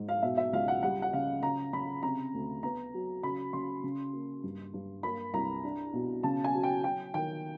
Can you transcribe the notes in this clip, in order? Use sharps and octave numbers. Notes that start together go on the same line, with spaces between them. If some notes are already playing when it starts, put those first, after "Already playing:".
Already playing: G#2
F5
B2 E5
E5
C#2 F5
F#5
G3 F#5
F#5
C#3 F5
C#3 A#5
C#3 B5
C3 A#5
D2
B3 A#5
F#3
C#3 B5
C#3 C6
C#3
A#3
G2
G2
A#3 B5
C2 A#5
D4
B2
C#3 A5
G#5
F#3
G5
F#3 G5
D#3 G5